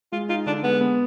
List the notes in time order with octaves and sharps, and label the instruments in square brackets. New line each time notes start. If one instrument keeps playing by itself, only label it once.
[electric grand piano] G#3 [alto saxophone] F4
[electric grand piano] D#4 [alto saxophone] F4
[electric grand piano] D3 [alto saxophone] D4
[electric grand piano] G#3 [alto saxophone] B3
[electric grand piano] B3